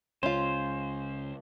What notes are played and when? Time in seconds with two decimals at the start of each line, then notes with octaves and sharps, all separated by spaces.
0.23 C#2 C#3 C#4 F4 C5